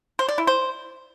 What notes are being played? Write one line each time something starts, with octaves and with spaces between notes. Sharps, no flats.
C5
D5
E4
C5